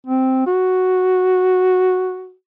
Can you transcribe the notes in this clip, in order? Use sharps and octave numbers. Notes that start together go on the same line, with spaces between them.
C4
F#4